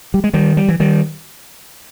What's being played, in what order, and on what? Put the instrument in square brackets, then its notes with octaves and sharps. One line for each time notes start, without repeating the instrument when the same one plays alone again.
[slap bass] G3
G#3
D#3 G3
G3
E3
D#3 G3